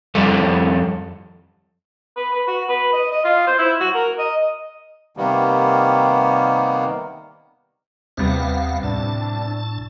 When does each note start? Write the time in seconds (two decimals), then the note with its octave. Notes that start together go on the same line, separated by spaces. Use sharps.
0.15 F2 G3 A4
2.17 B4
2.33 B4
2.48 F#4
2.69 B4
2.93 D#5
3.11 D#5
3.24 F4
3.47 C5
3.59 E4
3.80 F#4
3.95 A#4
4.19 D#5
5.17 C3 D#3 G3 A#3 B3
8.17 D#2 C3 G3 B3 F5 F#5
8.83 A2 D4 A5